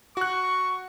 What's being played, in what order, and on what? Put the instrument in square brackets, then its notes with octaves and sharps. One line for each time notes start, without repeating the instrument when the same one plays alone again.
[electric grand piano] F#4 F#6 [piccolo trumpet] C#6